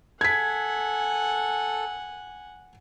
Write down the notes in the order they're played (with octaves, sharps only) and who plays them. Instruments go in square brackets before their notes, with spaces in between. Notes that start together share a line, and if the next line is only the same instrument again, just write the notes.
[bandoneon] A4 [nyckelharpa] F#5 G#5 [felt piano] G#6 B6